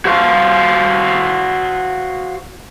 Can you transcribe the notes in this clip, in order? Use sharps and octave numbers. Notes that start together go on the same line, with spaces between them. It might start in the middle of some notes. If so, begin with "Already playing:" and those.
F#4 C5 F5